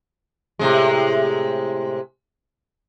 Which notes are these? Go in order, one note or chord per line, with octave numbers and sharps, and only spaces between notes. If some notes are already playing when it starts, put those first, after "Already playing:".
A2 C3 G#3